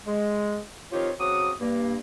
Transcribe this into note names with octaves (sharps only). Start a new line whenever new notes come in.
G#3
D#3 F3 C4 F4 G4 C#5
C#3 F#3 C4 F#4 D6 D#6
G2 A#3